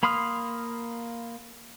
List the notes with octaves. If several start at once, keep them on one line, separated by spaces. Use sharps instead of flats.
A#3 B5 C6 D#6 F6